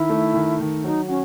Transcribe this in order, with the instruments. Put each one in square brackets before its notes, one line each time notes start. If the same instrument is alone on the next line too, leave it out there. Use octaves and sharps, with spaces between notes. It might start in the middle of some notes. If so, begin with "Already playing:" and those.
Already playing: [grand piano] D#3 [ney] E4
[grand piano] A3
D#3
D#3
[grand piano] F#3 [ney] D#4
[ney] C#4 [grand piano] F#4